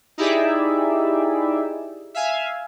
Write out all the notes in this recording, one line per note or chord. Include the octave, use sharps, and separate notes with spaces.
D#4 E4 G4 G#4 D5 E5
E5 F5 G#5